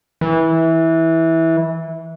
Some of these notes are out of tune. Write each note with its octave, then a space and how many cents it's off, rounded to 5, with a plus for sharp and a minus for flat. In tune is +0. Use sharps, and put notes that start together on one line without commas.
E3 -15